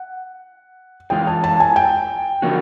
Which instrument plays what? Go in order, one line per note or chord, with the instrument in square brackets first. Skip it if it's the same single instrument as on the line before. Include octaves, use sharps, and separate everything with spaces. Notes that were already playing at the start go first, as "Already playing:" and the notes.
Already playing: [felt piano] F#5
[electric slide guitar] E3 G#3 C#4 F4 [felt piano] G5
[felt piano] A5
A5
G#5
G5
[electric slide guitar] D3 F3 A#3 C#4 F#4